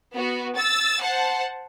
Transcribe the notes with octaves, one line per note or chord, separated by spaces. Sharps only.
B3 F#4
E6 A6
C5 F#5 A5